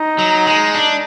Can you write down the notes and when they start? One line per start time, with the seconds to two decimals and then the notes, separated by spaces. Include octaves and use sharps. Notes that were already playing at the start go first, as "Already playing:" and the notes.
Already playing: D#4
0.18 F#3
0.47 G#3
0.75 D4